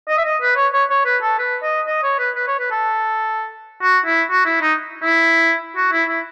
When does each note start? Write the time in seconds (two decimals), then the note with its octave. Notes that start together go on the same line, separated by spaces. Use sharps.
0.08 D#5
0.18 E5
0.25 D#5
0.41 B4
0.56 C#5
0.73 C#5
0.90 C#5
1.05 B4
1.22 A4
1.39 B4
1.63 D#5
1.87 D#5
2.03 C#5
2.19 B4
2.35 B4
2.48 C#5
2.59 B4
2.71 A4
3.82 F#4
4.06 E4
4.30 F#4
4.46 E4
4.62 D#4
5.03 E4
5.76 F#4
5.92 E4
6.09 E4